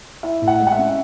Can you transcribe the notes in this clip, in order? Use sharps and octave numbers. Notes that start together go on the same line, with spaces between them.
E4 E5
A2
F#5
G#3
F#5
E5
C#4